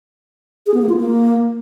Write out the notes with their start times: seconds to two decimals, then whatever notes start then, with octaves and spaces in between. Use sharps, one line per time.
0.67 G#4
0.74 B3
0.82 A#3
0.89 F4
0.97 A#3